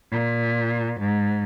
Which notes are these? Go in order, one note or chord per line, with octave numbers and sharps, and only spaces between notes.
A#2
G#2